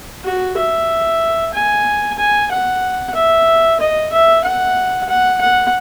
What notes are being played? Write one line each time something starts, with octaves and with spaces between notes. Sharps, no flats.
F#4
E5
G#5
G#5
F#5
E5
D#5
E5
F#5
F#5
F#5